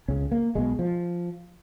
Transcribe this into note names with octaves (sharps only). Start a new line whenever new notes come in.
C#2 C#3 C#4
A#3
B1 B2 G#3
F3